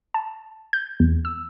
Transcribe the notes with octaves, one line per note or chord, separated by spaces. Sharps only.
A5
G6
E2
E6